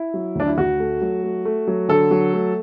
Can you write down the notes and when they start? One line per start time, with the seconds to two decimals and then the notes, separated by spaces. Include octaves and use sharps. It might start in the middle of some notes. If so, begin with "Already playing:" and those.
Already playing: E4
0.14 F#3
0.35 D2 D4
0.48 E4
0.57 D2 F#4
0.80 A3
1.01 F#3
1.24 A3
1.45 A3
1.67 F#3
1.89 D3 A4
2.11 F#3
2.33 A3